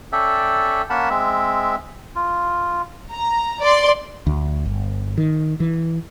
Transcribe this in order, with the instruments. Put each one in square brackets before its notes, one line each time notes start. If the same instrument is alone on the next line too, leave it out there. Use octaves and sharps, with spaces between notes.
[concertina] C#4 A4 D5 E5 G5
A#3 C#4 A#4 F#5 A5 B5
G#3 C4 E5
F4
[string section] A#5
D5 C6
[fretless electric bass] D2
G1
D#3
E3